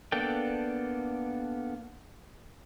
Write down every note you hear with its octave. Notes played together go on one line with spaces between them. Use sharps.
A#3 B3 D4 A4 G5